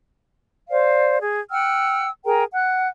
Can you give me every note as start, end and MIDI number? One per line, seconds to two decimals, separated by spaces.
0.70 1.17 72
0.70 1.17 74
0.70 1.17 77
1.20 1.39 68
1.51 2.08 78
1.51 2.08 79
1.51 2.08 88
1.51 2.08 89
2.25 2.44 68
2.25 2.44 70
2.25 2.44 79
2.25 2.44 82
2.53 2.88 78
2.53 2.88 90